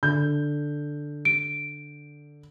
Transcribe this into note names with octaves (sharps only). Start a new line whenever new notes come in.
D3 G6
D7